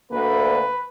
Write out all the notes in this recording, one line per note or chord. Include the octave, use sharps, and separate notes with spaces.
D2 A#3 B4